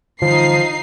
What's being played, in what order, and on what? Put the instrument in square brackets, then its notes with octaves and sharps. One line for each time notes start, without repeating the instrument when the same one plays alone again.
[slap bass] D3 E3 G3 [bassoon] F3 [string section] D#4 C7